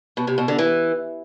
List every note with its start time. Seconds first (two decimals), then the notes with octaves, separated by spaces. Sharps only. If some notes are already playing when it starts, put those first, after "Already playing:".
0.17 B2
0.27 C3
0.38 B2
0.48 D3
0.59 E3